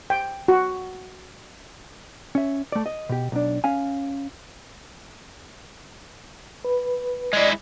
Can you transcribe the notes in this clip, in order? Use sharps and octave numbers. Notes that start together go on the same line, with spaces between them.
G5
F#4
C#4 E5
A3 D5
D#5
B2 G4
B1 D4
C#4 F5 G#5
B4
G#3 E4 D5 D#5